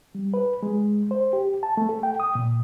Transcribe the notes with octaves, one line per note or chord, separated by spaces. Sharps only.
G3
B4
G#3
C5
G4
A5
A3
A4
G5
D#6
A#2